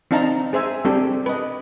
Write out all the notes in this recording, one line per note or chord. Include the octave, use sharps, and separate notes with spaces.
C4 D4 D#4 F5 A5 A#5
G#4 C5 E5 G#5
G3 C4 D4 G4 A4
B4 D#5